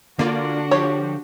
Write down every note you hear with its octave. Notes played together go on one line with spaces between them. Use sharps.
D3 A#3 D4 F4 F#4 D5
F3 G4 C#5